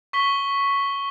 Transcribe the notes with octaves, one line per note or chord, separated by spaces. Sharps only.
C#6 B6 G7